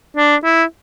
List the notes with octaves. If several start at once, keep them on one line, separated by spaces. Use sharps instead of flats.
D4
E4